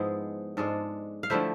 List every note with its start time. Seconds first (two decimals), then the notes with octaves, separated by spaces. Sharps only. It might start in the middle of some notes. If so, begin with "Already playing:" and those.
Already playing: G#2 F3 G#3 B3 E4 G#4
0.57 G#2 G#3 D4 F4 A4
1.23 F5
1.30 D3 F3 A3 E4 C5 E5